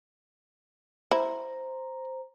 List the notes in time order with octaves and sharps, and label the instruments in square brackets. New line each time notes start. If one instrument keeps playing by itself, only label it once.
[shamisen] E4 [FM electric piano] C5 A#5